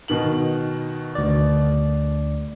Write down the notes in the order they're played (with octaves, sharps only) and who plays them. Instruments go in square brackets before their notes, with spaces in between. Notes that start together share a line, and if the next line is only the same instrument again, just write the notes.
[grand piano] B2 D#3 F#7
[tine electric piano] D2 D5